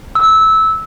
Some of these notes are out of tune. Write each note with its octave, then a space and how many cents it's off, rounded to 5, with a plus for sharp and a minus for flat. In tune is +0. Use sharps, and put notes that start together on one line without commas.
E6 -15